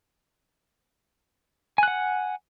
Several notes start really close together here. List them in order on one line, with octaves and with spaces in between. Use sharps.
G#5 F#6 F#5